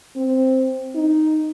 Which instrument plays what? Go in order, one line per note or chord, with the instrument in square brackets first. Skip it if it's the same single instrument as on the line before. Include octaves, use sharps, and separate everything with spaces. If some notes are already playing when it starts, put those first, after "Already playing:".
[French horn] C4
D#4